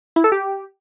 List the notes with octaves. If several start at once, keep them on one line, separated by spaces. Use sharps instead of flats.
E4
A4
G4